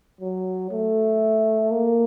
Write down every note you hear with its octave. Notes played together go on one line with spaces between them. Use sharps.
F#3
A3
A#3